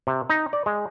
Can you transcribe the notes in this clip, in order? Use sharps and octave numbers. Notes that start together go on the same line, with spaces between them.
C3
D#4
D5
G#3